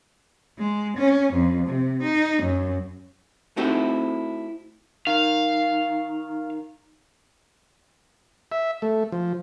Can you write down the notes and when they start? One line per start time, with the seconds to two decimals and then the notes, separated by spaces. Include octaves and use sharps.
0.59 G#3
0.97 C#4
1.33 F2
1.68 C3
2.03 D#4
2.43 F#2
3.57 A3 C4 D#4 E4 F#4 G4
5.07 D#3 F5
8.52 E5
8.82 A3
9.12 F3